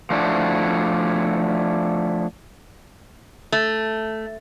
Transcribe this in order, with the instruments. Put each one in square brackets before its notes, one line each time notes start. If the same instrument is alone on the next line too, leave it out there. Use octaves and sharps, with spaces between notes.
[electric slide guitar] F3 A3 D4 E4 F#4
[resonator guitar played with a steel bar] A3